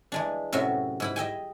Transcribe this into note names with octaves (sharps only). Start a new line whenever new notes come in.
E3 G#3 D4
F#2 A2 C3 F#4 E5
G#2 E4 B5
D#5 E5 G5 G#5